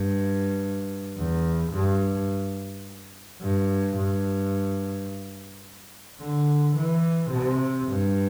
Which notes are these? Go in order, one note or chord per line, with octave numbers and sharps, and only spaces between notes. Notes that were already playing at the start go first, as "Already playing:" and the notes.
Already playing: G2
E2
G2
G2
G2
D3
E3
C3
G2